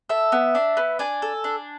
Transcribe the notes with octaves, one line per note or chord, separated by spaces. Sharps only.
A4 E5
B3
D4
B3
D4 G#5
A4
D4